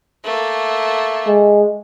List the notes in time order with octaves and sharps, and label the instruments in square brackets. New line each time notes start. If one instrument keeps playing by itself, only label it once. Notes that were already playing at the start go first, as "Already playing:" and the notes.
[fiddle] A3 A#3
[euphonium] G#3